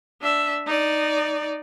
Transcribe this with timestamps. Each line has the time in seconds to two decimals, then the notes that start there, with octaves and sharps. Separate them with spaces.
0.22 D4 E5
0.66 D#4 D5